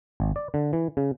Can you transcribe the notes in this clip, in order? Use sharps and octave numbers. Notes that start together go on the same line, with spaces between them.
G#1
D5
D3
E3
C#3